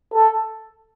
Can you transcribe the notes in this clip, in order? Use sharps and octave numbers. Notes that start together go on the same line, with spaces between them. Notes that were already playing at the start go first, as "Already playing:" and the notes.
A4